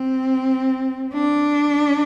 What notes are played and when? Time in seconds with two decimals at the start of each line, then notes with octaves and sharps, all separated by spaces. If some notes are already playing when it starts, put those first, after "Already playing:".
Already playing: C4
1.14 D4